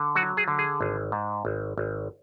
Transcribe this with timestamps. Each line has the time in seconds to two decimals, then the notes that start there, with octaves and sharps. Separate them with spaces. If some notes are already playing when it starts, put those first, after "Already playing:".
Already playing: D3
0.15 F#3 F#4
0.37 G#4
0.48 D3
0.59 G#4
0.81 G#1
1.12 G#2
1.45 G#1
1.78 G#1